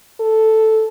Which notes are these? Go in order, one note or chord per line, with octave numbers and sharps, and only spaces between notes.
A4